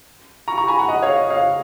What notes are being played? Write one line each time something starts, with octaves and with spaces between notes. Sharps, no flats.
A#5 C#6
A#5 C#6
G#5 B5
F#5 A#5
D#5 F#5
C#5 F5
D#5
C#5 F5